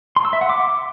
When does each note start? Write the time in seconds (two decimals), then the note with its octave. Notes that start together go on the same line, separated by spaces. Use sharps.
0.16 C6
0.25 E6
0.33 E5
0.41 F#5
0.50 D6